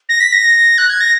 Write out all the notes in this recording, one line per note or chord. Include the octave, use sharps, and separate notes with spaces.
A#6
B6
A#6
F#6
G#6
A#6